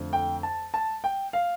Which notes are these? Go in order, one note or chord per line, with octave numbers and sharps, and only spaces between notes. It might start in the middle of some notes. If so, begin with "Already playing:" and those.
Already playing: F2 D3 A3
G5
A5
A5
G5
F5